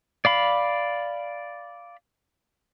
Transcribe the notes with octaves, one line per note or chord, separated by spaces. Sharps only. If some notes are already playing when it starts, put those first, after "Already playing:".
D5 F5 B5